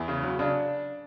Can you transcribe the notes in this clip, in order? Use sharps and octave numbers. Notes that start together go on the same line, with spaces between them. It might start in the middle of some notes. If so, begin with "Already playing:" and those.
Already playing: E2 E4
C#3
F#3
C#3 D4